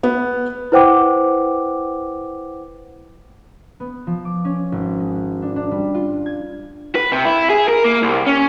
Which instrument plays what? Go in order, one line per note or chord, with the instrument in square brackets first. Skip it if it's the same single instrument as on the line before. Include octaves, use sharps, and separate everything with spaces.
[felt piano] B3
[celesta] E4 B4 C5 F#5 G5 D6
[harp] B3
F3
D6
C#4
G#1
G#3
D4
D4
G3
F4
G#6
[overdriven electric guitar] B4
C3
E4
G#4
A#4
A#3
C2
C#4